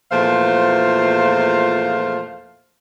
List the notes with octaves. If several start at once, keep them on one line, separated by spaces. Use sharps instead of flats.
E2 A#2 F3 A3 C5 F5